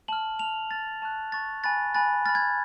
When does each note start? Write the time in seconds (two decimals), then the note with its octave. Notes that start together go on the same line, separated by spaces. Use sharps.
0.08 A5 F6 F#7
0.39 A5 F6 F7
0.71 A5 F6 A6
1.02 A5 C#6 F#6
1.32 A5 C#6 F#6 A6
1.63 G#5 B5 F#6 A6
1.95 G#5 B5 F#6 A6
2.26 B5 F6 A6
2.35 G#6